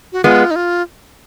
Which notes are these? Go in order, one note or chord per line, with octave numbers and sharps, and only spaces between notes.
F#4
G#3 B3 F4
D#4
F4